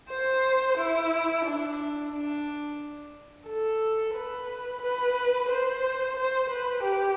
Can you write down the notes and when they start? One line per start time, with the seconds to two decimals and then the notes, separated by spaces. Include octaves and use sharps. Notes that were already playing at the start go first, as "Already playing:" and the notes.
0.10 C5
0.78 E4
1.45 D4
2.13 D4
3.47 A4
4.14 B4
4.81 B4
5.49 C5
6.17 C5
6.50 B4
6.83 G4